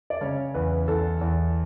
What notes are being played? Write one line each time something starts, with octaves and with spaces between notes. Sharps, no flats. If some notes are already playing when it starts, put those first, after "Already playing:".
D5
C#3 C#4 C#5
E2 B4
E2 A4
E2